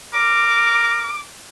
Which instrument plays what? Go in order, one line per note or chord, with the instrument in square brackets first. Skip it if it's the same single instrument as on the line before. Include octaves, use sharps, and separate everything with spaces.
[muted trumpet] A#4 [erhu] D6